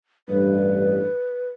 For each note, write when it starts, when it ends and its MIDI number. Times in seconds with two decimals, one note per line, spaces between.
0.29 1.06 33
0.29 1.06 43
0.29 1.49 71